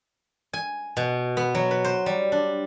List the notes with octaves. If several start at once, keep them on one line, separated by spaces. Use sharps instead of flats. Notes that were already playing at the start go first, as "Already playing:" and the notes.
G#5
B2
B3
F#3
B4
C5
G3
D4